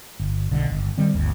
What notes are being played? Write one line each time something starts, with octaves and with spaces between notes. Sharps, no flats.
G1
B1 D3
G1
D#3 G3 C4
G1 D2